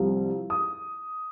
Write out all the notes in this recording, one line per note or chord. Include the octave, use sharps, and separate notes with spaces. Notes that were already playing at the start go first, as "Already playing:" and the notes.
Already playing: C2 C3 F3
D#6